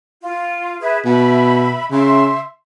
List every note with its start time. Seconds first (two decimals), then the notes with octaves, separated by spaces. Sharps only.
0.21 F4
0.81 G#4 B4 E5
1.05 B2 E5 B5
1.91 C#3 E5 C6